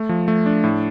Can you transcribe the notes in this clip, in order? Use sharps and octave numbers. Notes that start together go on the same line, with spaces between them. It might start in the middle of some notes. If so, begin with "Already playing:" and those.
Already playing: A3
F3
A3
D4
A2